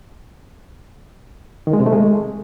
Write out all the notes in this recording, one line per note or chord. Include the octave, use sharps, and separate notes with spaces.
D#3
G#3
C3
A3
G#3